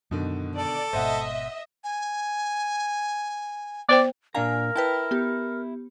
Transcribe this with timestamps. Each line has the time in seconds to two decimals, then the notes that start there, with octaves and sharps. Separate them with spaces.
0.11 F#2 B2 D3 D#3
0.56 A4 D5
0.93 G#1 G#2 B2 C5 D#5 E5 F#5
1.84 G#5
3.89 B3 C5 D5 G5
4.35 A#2 D4 A#4 F5 G#5 A#5
4.76 E4 B4 G5 A5
5.11 B3 G4